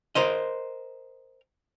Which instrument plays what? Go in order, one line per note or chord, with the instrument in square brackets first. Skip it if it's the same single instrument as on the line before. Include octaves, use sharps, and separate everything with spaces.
[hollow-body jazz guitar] A#4 C5 D#5